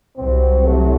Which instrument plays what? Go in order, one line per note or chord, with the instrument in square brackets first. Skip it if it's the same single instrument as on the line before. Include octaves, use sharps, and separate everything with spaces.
[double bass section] C2 C3 F#3 [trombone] C4
[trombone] A3